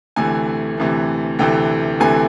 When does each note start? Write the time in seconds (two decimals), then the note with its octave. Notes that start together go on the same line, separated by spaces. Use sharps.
0.16 D2 C3 E3 A3 G#5
0.77 D2 C3 E3 A3
1.39 D2 C3 E3 A3 G5
2.00 D2 C3 E3 A3 G#5